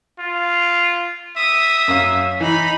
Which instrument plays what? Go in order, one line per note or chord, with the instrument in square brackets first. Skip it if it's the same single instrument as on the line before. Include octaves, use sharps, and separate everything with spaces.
[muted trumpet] F4
[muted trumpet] E5 [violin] D#6
[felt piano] F#2 C#4 F5
[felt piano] E3 [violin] D#4 B5